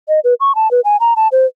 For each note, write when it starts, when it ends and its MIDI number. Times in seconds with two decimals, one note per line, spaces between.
0.09 0.20 75
0.24 0.34 71
0.40 0.55 85
0.55 0.71 81
0.71 0.80 71
0.85 0.97 80
1.00 1.14 82
1.16 1.28 81
1.32 1.46 72